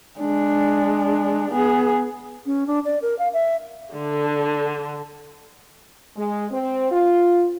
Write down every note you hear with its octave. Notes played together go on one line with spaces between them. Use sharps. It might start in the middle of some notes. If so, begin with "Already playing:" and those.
G#3 D4
B3 G#4
C#4
D4
D5
A#4
F5
E5
D3
G#3
C4
F4